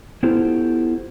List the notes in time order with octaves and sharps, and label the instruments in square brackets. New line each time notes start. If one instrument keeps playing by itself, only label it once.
[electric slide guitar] B3 E4 F4 G4 A4 C5